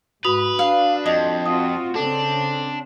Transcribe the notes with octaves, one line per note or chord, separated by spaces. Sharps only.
G#2 F#4 B4 D#6 F7
D4 F5
F2 D#5
C4 F4 F#4 D#6
C#3 C4 D4 A4